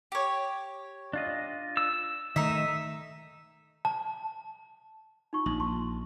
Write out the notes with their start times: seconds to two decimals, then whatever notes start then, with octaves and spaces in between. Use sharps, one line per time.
0.12 G4 C#5
1.13 D4 F4 D#5
1.77 E6
2.36 D#3 A3 D#4 E5
3.85 A5
5.33 D#4 F4 C#6
5.46 A#1 D#4 F#7
5.60 A5 C6 C#6